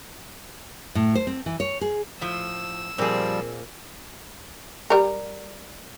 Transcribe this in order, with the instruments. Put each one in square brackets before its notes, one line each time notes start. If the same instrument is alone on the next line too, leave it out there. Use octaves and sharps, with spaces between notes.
[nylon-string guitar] A2
C5
C4
E3
C#5
G#4
[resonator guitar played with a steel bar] A2 F3 [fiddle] E6
[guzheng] A#2 [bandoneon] F3 G3 [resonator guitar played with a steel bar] C4 G#4
[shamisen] G3 A#4